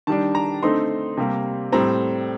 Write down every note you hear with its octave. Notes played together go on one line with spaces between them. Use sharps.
D#3 G3 D4 A5
A#5
D3 A3 C4 D#4 C6
C3 G3 A#3
A2 G3 C4 A#5